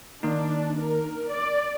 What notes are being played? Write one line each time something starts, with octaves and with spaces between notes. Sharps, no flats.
D#3 A#3 D4 D#4
A#4
D5